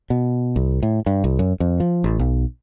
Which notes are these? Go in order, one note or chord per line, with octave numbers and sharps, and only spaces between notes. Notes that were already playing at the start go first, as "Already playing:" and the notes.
B2
C2
A2
G2
C2
F#2
F2
F3
A1
B1